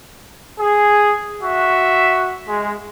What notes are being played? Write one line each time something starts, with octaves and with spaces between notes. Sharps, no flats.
G#4
F#4 E5
G#3